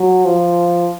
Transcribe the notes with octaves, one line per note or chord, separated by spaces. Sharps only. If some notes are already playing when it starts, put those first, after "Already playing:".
Already playing: F#3
F3